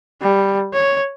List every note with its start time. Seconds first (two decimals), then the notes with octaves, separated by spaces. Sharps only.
0.22 G3
0.73 C#5